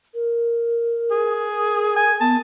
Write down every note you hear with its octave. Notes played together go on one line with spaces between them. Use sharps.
A#4
G#4
G#5
B3 A5